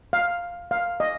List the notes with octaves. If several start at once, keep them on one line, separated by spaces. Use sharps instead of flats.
F5
F5
D#5